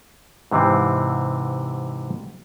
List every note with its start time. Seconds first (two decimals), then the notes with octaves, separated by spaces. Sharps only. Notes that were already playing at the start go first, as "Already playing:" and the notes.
0.51 G#2 C3 E3 C4